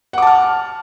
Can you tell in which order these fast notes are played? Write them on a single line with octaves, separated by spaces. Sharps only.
F#5 D6 A5 F6